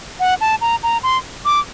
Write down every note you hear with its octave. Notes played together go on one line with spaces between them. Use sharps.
F#5
A5
A#5
A#5
C6
D6